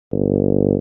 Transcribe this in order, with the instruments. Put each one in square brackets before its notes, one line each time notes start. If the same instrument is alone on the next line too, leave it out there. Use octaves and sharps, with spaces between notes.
[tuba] G1